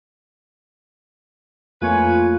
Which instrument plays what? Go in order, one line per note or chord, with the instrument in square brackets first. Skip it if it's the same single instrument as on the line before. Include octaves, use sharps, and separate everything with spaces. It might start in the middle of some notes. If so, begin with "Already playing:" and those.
[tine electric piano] F2 A3 A#3 [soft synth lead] F4 [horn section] B4 C#5 G#5